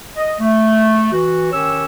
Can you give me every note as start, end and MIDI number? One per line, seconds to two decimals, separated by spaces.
0.17 0.35 75
0.40 1.10 57
1.13 1.50 52
1.13 1.50 66
1.52 1.85 51
1.52 1.85 61
1.52 1.85 67
1.52 1.85 73
1.52 1.85 88